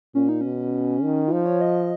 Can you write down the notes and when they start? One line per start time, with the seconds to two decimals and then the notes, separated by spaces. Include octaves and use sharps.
0.15 A#2 C#4
0.29 D#4
0.41 B2 C#4
1.03 D#3
1.28 F4
1.31 F3 D#4
1.46 C#5
1.61 D#5